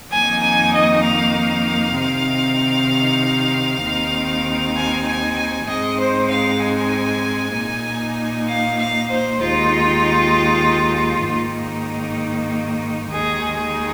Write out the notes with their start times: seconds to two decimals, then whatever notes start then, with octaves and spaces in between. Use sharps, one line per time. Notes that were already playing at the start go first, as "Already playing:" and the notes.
0.12 F2 D#3 A#3 D#4 G#5
0.43 G#5
0.74 D#5
1.05 F5
1.98 C3 D#3 C4 D#4
3.84 D#2 D#3 C4 D#4
4.77 G#5
5.07 G#5
5.39 G#5
5.69 G#2 G#3 C4 D#4 D#5
6.00 C5
6.31 F5
6.62 G#5
7.56 A#2 A#3 D#4
8.48 F5
8.78 F5
9.10 C5
9.41 D#2 D#3 G#3 D#4 F4
11.27 G#2 D#3 A#3 D#4
13.12 D#2 D#3 G#3 D#4 G#4
13.59 G#4